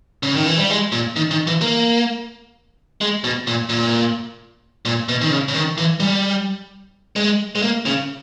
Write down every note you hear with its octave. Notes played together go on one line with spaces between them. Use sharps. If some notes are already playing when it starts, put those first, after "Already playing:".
C#3
D#3
E3
G3
G#3
A#2
D#3
D#3
E3
A#3
G#3
B2
A#2
A#2
A#2
B2
D#3
C#3
C#3
D#3
E3
G3
G#3
G#3
A#3
C#3